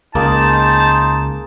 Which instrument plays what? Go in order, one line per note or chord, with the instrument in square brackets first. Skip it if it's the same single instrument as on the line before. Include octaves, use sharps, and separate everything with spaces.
[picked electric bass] C#2 [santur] A#3 G#4 [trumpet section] D#4 C5 [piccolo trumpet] A5